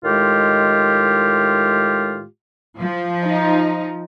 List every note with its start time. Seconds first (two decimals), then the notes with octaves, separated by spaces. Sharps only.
0.04 A2 D#3 G#3 F4 G4
2.80 F3
3.23 D#4